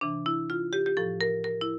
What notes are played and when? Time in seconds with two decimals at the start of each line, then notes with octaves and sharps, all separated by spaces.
0.01 C3 E3 D4
0.26 E4
0.50 F4
0.73 G4
0.86 G4
0.97 A2 F3 A4
1.21 A#4
1.44 A#4
1.61 E4